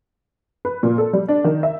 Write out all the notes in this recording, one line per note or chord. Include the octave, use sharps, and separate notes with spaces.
B4
A#2
A4
G3
D4
D#3
E5